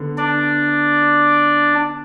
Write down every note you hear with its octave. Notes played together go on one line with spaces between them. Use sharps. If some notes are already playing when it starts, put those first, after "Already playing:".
Already playing: D3 B3
D4 D5